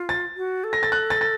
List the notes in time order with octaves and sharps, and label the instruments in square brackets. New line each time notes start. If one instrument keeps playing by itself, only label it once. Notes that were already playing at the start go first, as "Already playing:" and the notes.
Already playing: [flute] F4
[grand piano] A6
[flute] F#4
A4
[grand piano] A#6
A6
F#6
A6
A6